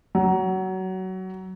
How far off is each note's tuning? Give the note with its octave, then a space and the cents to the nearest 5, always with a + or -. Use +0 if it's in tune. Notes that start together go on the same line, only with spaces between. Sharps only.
F#3 +20